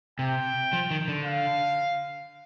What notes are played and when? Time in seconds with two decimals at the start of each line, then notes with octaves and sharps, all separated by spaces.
0.19 C3 G5
0.73 F3
0.91 D#3
1.08 D3
1.25 F5